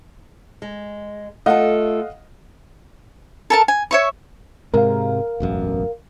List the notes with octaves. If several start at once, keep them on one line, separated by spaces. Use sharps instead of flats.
G#3
A3 F4 A4 D#5 F5 F#5
A4 A#4 A5
G#5
C#5 E5 C#6
G#2 C3 G#3 A#4 F5
E1 A1 F#2